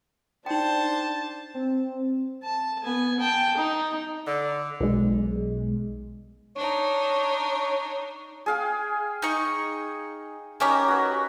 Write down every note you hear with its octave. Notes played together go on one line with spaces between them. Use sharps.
D4 D#4 C5 G5 A5
C4
A5
B3 G#5
G5 A5
D#4
D3
B1 G#3
D4 D#4 C#5
G#4 F5 G5
D#4 D#5 C#6
A#3 C#4 D#4 G4 A#4
F#4 B4